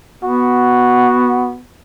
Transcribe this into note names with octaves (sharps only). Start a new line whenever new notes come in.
B3 F#4